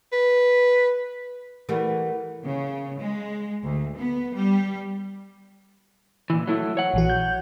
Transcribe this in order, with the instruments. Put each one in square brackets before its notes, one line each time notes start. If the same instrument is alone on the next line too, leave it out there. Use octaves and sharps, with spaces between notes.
[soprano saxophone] B4
[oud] E3 G3 A3 [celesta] A#4 F#5
[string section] C#3
G#3
D2
B3
G3
[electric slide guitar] A#2 E3
F#3 A3 E4
C#5 F#5
[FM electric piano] A#1 E3 F#4
G6